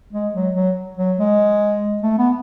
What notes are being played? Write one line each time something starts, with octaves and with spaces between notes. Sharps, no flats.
G#3
F#3
F#3
F#3
G#3
A3
B3